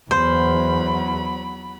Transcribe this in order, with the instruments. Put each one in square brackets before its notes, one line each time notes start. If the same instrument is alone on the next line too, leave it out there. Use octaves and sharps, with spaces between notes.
[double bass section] E2 [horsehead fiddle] F#3 B5 [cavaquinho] C5